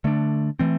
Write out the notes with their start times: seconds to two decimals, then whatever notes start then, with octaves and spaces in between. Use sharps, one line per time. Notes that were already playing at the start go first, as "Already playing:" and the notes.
0.04 D3 A3 D4
0.59 E3 A3 C4